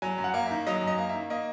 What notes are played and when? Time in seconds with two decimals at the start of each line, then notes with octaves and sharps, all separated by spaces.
0.02 F#3 G#5
0.18 F#2
0.24 F#5
0.34 A#3
0.46 E5
0.51 D#3
0.67 F#3 D#5
0.82 F#2
0.87 D#5
0.98 A#3
1.09 E5
1.14 D#3
1.30 A#3 D#5